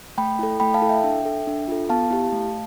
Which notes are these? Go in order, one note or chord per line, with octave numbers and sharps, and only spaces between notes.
A3 G5 B5
E4 A4
A3 G5 B5
F5 A5
E4 A4
E5 G5
D4
A4
D4
F4 A4
B3 F5 A5
E4 G4
A3